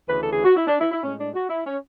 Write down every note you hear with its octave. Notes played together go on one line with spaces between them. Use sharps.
D2 C#3 E3 B4
A4
G#4
F#4
E4
D4
E4
E4
A2 G#3 C#4
D4
F#4
E4
C#4